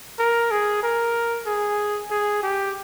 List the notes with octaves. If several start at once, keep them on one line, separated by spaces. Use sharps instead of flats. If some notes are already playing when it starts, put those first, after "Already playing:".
A#4
G#4
A#4
G#4
G#4
G4